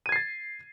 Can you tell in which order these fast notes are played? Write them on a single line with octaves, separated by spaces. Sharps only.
D#7 G#6 C7 A6